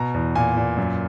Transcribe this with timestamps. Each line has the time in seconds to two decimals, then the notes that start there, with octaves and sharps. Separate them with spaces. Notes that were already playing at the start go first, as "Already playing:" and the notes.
Already playing: B2 A#5
0.14 E2
0.36 A#2 G#5
0.57 A#2
0.77 F#2